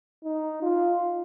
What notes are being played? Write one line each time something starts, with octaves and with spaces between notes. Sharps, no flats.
D#4
F4